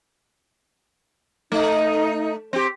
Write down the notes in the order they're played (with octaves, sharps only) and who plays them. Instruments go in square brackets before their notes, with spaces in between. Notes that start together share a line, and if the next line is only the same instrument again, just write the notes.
[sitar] A3 [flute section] D#4
[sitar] C4 G4